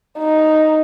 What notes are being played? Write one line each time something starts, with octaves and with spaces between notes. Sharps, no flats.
D#4